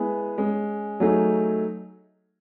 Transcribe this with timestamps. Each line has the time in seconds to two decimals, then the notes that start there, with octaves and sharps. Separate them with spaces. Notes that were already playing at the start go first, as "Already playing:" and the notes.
Already playing: G#3 B3 E4 G#4
0.38 G#3 C#4 G#4
1.00 F#3 A3 D#4 G#4